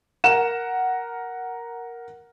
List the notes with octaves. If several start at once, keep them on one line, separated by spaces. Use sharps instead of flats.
A#4 F#5 E7